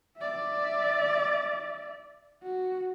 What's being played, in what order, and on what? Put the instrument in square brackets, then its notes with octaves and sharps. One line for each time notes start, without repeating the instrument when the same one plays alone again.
[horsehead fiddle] D5 E5
F#4